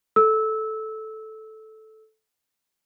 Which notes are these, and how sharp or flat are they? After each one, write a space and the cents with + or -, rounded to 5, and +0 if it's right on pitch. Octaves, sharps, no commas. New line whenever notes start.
A4 -5 E6 -20